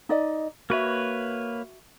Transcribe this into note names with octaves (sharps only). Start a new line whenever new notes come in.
D#4 D5 D#5
A#3 F#4 B4 C#5 E5